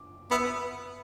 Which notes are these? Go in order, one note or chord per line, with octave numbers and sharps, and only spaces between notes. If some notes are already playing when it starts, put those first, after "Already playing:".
Already playing: D6
B3 E5 E6